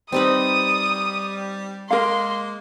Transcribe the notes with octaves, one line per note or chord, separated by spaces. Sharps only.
G3 C4 D#4 B4 D#6
G#3 A#3 A#4 F5 C6